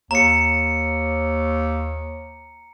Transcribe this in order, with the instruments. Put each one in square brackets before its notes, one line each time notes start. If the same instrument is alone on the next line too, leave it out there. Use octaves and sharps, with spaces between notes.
[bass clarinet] D#2 [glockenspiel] A#5 C#7